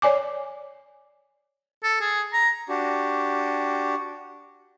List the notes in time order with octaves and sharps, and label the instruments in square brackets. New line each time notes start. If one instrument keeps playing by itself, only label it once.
[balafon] C#5 D5 G#5 D6
[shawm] A4
G#4
A#5
[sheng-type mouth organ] D4 F#4 G4